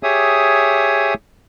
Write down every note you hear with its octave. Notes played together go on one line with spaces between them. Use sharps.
G4 G#4 C#5 E5 D#6